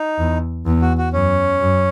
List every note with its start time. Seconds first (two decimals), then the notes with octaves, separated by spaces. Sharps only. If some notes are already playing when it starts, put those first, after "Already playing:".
Already playing: D#4
0.19 E2
0.66 E2
0.82 F#4
0.98 F#4
1.13 F#2 C#4
1.61 F#2